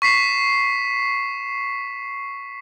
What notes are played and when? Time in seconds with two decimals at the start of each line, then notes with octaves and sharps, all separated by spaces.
0.02 C#6 B6 C7 E7